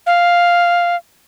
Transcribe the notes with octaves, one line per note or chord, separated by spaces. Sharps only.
F5